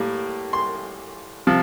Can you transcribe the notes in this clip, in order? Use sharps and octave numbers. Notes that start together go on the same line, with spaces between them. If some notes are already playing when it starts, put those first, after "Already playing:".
Already playing: A2 G3 A#3
C6
C3 F3